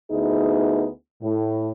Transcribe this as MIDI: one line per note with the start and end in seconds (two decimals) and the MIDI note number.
0.11 0.88 38
0.11 0.88 59
0.11 0.88 63
0.11 0.88 64
0.11 0.88 68
1.22 1.69 45